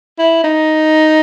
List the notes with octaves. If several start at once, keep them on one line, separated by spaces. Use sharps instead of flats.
E4
D#4